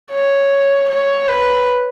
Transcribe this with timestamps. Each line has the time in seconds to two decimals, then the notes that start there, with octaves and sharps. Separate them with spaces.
0.12 C#5
0.88 C#5
1.28 B4